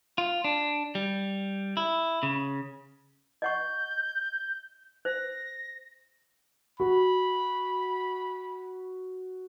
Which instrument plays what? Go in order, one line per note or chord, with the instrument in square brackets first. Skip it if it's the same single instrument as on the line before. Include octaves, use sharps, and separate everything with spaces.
[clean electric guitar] F4
D4
G3
E4
C#3
[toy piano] D#5 F#5 C#6 [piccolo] G6
[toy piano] C5 [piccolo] A#6
[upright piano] F#4 [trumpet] B5